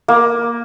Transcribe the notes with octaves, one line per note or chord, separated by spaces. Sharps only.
A#3